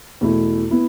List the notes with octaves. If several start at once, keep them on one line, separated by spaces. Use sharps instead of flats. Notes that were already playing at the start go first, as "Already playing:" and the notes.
E2 B2 A3 E4
B3 E4